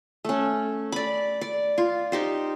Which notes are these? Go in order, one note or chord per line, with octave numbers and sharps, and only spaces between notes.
A3 C#4
D5 B5
D5
F4
D#4 G4 C5